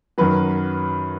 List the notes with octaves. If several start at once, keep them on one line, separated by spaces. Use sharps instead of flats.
F#2 D#3 F#3 B4